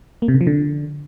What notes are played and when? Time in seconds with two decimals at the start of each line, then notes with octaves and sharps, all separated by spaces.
0.22 A#3
0.28 C3
0.35 C#3
0.41 F3
0.47 D3